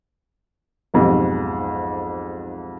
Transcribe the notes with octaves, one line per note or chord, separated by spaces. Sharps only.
B1 F2 G#2 F3 G4